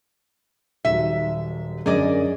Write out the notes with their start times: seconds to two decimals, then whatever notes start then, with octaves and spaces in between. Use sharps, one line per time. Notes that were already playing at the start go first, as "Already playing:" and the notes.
0.85 D#1 D#2 F#3 E5
1.86 F#2 D3 G#4 A#4 D5 D#5